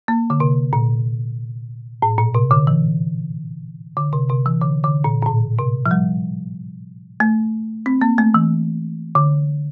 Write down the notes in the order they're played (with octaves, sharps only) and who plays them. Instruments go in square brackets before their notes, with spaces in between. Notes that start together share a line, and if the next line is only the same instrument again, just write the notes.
[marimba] A#3
D3
C3
A#2
A2
A#2
C3
D3
E3
D3
C3
C3
E3
D3
D3
A#2
A#2
A2
C3
F3
G3
A3
C4
A#3
A3
E3
D3